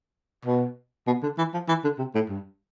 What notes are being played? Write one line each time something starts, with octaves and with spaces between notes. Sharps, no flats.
B2
B2
D3
E3
F3
E3
D3
C3
A2
G2